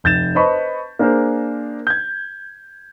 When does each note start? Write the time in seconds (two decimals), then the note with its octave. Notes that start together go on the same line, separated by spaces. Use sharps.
0.04 F1 G6 A6 E7
0.35 B4 C5 D#5 A5 B5 C#6
0.99 A#3 D4 G#4 A#4 C5
1.87 G6 G#6